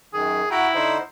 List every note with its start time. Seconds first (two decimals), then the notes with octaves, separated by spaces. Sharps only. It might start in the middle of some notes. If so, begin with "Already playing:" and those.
0.13 F#2 D#3 G#4
0.51 E4 F#4 G5 A#5
0.75 D3 D#4 C5